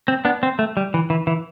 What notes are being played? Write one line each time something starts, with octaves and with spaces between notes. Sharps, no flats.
C4
B3 D4
C4
A3
G3
E3
E3
E3